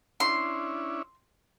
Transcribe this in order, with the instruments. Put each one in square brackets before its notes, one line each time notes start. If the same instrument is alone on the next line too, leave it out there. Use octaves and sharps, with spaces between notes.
[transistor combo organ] C#4 D4 E4 [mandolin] C6